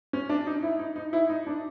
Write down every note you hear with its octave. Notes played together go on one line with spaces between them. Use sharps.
C#4
D4
D#4
E4
D#4
D#4
E4
D#4
D4